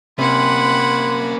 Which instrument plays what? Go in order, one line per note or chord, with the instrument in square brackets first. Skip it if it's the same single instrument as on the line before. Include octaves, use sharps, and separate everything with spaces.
[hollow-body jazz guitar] C3 [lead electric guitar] A#3 C#4 [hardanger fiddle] F#5 B5 [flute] C6